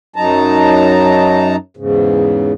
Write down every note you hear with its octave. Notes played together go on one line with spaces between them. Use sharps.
F#2 F#3 D#4 A5 A#5
E2 G#2 C#3